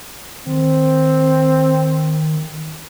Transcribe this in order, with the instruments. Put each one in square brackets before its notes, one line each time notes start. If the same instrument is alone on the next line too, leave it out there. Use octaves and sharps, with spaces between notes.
[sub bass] D#3 [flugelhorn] C4